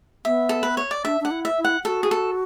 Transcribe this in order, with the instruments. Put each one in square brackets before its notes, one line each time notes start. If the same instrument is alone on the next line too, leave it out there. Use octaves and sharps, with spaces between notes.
[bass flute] B3 [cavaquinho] E5
[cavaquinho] A4
B4
C#5
D5
[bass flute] D4 [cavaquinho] E5
[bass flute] D4 [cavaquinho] F#5
[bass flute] E4
[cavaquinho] E5
[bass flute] E4
[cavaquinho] F#5
[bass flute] F#4 [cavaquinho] A4
[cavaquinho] G#4
A4